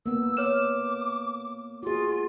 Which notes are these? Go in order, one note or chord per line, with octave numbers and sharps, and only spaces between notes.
A#3 B3 E6
C#5 D6 F6 E7
F4 F#4 G#4